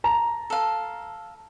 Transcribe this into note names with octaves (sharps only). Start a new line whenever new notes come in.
A5 A#5
A4 F5